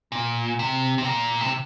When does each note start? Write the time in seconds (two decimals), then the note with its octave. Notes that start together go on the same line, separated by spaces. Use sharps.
0.12 A#2
0.59 C3
0.98 C3
1.05 A#2
1.41 C3